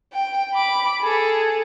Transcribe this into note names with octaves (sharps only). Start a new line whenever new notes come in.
G5
B5 D6
G#4 A4